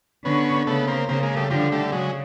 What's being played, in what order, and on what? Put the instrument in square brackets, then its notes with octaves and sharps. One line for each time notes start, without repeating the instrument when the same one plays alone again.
[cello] D3 [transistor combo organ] B3 C#4
[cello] C#3 [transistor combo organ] A3 B3
[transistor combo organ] A#3 C4
[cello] C#3 [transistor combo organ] A#3 C4
[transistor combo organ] G#3 A#3
G3 A3
[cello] D3 [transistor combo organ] F3 G3
[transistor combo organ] G3 A3
[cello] C#3 [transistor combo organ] F#3 G#3